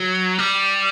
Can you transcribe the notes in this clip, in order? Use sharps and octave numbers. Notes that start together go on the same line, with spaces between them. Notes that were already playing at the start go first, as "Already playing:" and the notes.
Already playing: F#3
G3